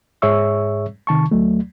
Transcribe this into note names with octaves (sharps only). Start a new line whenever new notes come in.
G#2 G#4 C#5 E5 C#6 E6
C3 D#3 A5 C#6
D2 F#3 A3